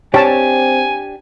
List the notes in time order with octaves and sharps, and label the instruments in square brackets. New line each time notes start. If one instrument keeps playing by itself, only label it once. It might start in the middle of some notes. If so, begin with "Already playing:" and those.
[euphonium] C4 [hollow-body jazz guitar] D4 G4 [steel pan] C#5 A5 [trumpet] G#5